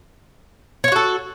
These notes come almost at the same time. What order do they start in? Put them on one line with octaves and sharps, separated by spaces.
C#5 F4 F#4 A4